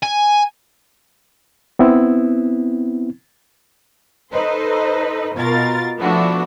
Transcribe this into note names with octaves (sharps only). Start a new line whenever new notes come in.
G#5
B3 C4 E4
D#4 A4 B4 C5
B2 F4 A#4 A6
F3 A3 B3 D4 E4 F#4